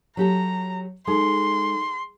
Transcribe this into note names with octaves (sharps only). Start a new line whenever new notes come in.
F#3 G4 A4 A#5
G#3 D#4 A4 C6